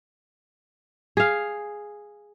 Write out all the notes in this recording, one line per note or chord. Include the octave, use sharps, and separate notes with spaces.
G#4 F5